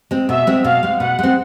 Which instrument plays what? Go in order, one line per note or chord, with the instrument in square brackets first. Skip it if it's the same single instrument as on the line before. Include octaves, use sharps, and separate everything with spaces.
[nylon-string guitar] G#3 C4
[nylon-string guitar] B2 [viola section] E5
[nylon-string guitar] G#3 C4
[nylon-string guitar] B2 [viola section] F5
[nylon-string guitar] G#3 C4
[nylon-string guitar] B2 [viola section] F#5
[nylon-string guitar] G#3 C4